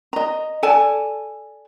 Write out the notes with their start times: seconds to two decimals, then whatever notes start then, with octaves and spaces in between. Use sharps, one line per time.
0.13 D#5 A#5
0.63 A4 D5 G#5 A5